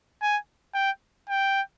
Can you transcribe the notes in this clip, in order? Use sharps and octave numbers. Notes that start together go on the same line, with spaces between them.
G#5
G5
G5